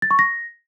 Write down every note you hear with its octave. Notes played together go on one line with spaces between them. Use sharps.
A6
C#6
A#6